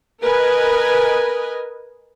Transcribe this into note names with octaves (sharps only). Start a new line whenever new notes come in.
A#4 B4 D#5 G#5